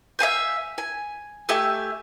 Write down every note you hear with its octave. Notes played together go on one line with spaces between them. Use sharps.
E5 F5 G#5 G6
G#5
A3 G4 E5 G#5